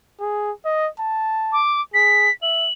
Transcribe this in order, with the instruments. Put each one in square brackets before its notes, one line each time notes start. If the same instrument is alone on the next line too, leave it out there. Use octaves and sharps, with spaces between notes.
[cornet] G#4
D#5
A5
[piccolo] D6
[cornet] G#4 [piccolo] B6
[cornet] E5 [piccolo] F#7